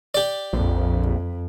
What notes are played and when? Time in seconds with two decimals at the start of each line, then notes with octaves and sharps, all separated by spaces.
0.14 G4 D5
0.53 A#1 F2